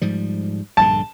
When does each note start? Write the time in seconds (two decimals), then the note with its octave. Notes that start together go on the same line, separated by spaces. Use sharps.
0.02 G#2 F3 G3
0.77 A#1 G2 D3 A5